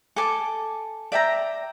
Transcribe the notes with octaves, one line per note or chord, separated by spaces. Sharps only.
A4 G#5 A5 D6
D5 E5 G5 A#5